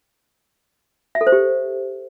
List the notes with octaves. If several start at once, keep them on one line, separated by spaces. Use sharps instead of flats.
E5
A4
C5
G4